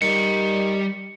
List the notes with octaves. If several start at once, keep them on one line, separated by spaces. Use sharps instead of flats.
D#3 G3 D5 C#7